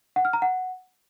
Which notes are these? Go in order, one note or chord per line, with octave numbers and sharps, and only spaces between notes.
F#5
F6
A#5
F#5